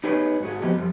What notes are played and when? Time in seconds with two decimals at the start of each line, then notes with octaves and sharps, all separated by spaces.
0.04 D#4 G4 G#4 B4 C#5
0.41 G#2 F#4 G#4
0.62 F3 A#3 B3 F#4 G4 D#5
0.74 F#2 F3 G3